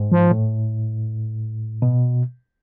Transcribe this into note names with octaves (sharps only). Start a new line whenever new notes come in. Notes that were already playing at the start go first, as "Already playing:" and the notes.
Already playing: G#2
F3
A2
B2